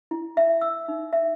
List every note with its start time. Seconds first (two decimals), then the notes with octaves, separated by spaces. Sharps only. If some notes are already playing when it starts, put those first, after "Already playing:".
0.11 E4
0.37 E5
0.61 E6
0.88 D#4
1.13 E5